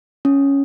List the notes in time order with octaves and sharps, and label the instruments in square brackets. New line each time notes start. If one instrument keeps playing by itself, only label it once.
[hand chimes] C#4